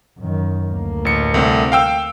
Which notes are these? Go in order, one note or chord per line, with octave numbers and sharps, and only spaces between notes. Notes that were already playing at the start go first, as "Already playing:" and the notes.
F#2 D#3
D2 A#3
A1 C#7
C2 A3 C4
F5 G5 E6